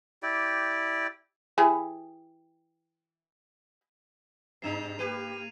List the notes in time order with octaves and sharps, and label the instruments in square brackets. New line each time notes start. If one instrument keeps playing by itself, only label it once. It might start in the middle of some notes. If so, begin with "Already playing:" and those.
[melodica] E4 G4 D5 G5
[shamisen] E3 G4 G#4
[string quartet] G#2 [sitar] C3 D4 D#4 [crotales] C7 E7 F7
[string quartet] A#3 F6 G#6 [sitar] G4 B4 [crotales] D#7